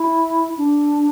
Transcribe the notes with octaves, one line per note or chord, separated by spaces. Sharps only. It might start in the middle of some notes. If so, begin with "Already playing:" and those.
Already playing: E4
D4